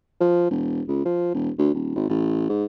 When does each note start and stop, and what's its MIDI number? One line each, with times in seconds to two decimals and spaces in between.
0.20 0.49 53
0.50 0.81 28
0.88 1.05 37
1.05 1.30 53
1.34 1.50 28
1.58 1.72 38
1.74 1.95 27
1.96 2.06 32
2.09 2.47 33
2.49 2.65 44